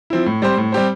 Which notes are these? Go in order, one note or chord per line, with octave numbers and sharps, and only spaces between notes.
F3 C4 E4
A2
G3 C4 G4 C5
A2
G3 C4 G4 C5